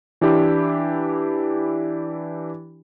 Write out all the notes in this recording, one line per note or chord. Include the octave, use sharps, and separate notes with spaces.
E3 D4 E4 G4